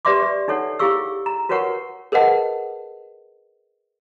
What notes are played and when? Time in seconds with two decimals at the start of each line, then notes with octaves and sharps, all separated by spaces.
0.05 G4 B4 D5 E5 C6 D6
0.23 D5
0.48 D4 D#4 A4 C#5 F#5
0.79 E4 G4 G#4 F5 C#6 E6
1.26 A#5
1.49 F#4 A#4 B4 C#5 F#5 C#6
2.12 G#4 A#4 B4 D#5 F#5 A5